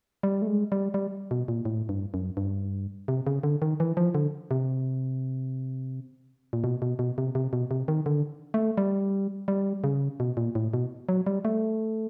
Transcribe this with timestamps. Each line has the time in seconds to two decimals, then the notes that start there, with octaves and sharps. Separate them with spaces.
0.23 G3
0.42 A3
0.47 G#3
0.72 G3
0.94 G3
1.31 B2
1.48 A#2
1.65 A2
1.89 G2
2.14 F#2
2.37 G2
3.08 C3
3.27 C#3
3.43 D3
3.62 D#3
3.80 E3
3.97 F3
4.15 D3
4.51 C3
6.53 A#2
6.64 B2
6.82 B2
6.99 B2
7.18 C3
7.35 C3
7.53 B2
7.71 C3
7.88 D#3
8.06 D3
8.54 A3
8.78 G3
9.48 G3
9.84 C#3
10.20 B2
10.37 A#2
10.55 A2
10.74 B2
11.09 F#3
11.27 G3
11.45 A3